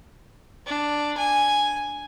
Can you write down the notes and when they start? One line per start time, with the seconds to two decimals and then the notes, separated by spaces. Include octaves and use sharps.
0.66 D4
1.18 G#5